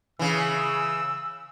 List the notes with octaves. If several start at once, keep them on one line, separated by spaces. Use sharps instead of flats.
C#3 E3 E6